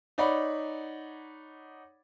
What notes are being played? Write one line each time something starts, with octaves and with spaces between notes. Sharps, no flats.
D#4 C#5 D5 F#5 B5